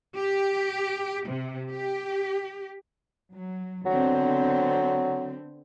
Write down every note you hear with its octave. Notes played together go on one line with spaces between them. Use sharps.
G4
C3
G4
F#3
D3 F#3 B3 C4